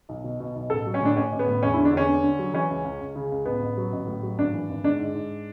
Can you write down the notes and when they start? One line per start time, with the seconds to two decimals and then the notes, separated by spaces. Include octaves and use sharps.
0.09 B1
0.24 B2
0.40 B2
0.56 B1
0.70 A1 A4
0.86 F#3
0.94 C#4
1.01 A2 D4
1.16 A1 C#4
1.32 A1
1.39 B3
1.47 A2
1.63 E2 C#4
1.74 D3 E4
1.85 D4
1.93 E2 C#4
2.09 D3
2.24 D3
2.39 F#3
2.54 E3 C#4
2.70 C#2
2.84 C#2
3.01 C#2
3.15 C#3
3.31 C#2
3.46 A1 B3
3.61 A1
3.77 F#3
3.92 A1
4.07 A2
4.23 F#3
4.37 G#1 D4
4.53 E3
4.69 G#1
4.83 G#2 D4
4.99 G#2
5.14 G#2